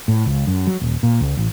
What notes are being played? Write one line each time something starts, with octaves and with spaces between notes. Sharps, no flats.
A2
C#2
F#2
F#3
D#1
A#2
C#2
A1